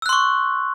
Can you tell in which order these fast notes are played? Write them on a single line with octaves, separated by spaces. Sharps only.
E6 F#6 C6 C#6